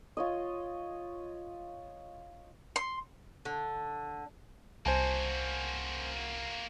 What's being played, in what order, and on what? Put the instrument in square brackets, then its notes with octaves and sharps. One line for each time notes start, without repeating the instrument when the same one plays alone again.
[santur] F4 C#5 D#5
[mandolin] C6
[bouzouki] D3
[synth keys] C2 [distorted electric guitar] A#3 F#4 [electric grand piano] C5 G#5 A5